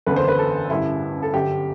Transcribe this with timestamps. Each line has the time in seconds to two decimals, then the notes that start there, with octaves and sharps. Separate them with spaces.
0.06 F#1 E2 D3 B4
0.16 C5
0.28 B4
0.39 A4
0.70 A1 G2 D3 E4
1.23 A4
1.34 G1 F#2 D3 G4